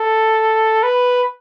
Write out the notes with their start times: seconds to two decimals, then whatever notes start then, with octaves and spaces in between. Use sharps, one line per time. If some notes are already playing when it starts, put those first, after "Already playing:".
Already playing: A4
0.83 B4